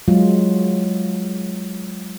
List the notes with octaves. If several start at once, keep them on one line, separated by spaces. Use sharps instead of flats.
F#3 G#3 F4